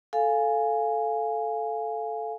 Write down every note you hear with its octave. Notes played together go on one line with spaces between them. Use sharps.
A4 F5 G#5